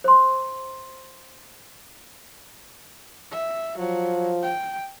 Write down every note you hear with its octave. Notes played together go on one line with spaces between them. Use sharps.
C5 C6
E5
F3 F#3
G5